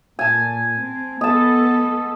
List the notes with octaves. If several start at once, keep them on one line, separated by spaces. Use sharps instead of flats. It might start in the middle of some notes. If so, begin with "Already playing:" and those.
A#2 G#5 A5
C4
B3 A4 D#5 A5